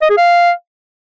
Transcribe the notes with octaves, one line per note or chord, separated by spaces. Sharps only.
D#5
G#4
F5